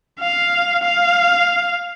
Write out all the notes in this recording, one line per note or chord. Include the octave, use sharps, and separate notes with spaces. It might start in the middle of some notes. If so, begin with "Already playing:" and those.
F5
F5